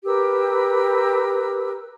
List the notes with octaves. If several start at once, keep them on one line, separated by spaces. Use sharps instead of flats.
G4 A#4 B4 E6